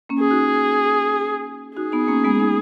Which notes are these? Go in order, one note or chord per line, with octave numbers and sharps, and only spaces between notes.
A#3 C#4
G#4
D#4 F#4
D#4 F#4 G#4
B3 D#4
A#3 C#4
G#3 B3
B3 D#4